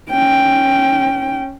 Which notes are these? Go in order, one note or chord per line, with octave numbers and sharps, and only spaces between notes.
C#4 G5